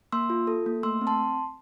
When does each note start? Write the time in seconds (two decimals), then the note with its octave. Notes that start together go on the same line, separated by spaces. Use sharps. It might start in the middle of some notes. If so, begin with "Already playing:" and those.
0.12 A#3 C6 E6
0.30 F4
0.47 A4
0.66 A#3
0.83 A3 C6 E6
1.01 C4
1.07 A5 C6